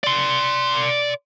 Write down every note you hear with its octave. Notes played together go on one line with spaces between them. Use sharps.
D5 C6